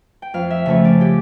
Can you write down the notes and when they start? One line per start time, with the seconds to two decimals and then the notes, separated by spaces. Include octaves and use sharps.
0.22 G5
0.34 F2 F5
0.50 E5
0.66 C#3 F3 A3 C#4 C#5
0.85 D5
1.01 G4